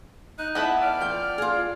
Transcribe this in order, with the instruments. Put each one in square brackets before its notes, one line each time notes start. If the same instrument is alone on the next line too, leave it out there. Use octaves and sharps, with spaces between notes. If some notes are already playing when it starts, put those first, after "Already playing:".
[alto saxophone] D#4 [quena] F#6
[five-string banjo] B3 E4 A4 [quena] E5 [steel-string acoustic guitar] F#5
[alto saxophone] D5 [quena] F6
[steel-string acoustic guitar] F3 G5
F4 G#4